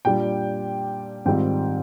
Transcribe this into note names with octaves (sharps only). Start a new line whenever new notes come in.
A#2 G3 D4 G5
G#2 D#3 G3 C4 F4 G5